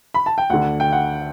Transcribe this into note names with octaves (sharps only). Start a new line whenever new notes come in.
B5
A5
G5
D2 D3 F#5
G5
F#5